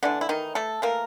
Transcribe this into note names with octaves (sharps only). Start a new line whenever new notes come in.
D3 E3 A3 D4
E4
D#3 D#4
A3 A4
E3 A3 A#3 A#4